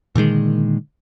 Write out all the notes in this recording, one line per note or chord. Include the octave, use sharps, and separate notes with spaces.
A#2 D3 D#3 G#3